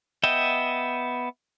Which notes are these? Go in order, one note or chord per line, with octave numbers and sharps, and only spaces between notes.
B3 D#5 E5 G5